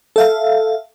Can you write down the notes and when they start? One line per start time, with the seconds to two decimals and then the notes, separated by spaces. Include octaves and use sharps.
0.16 A4 E5 F5